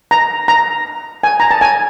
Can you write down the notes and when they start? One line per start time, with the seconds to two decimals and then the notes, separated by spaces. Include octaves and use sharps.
0.11 A#5
0.48 A#5
1.23 G#5
1.40 A#5
1.51 A5
1.61 G#5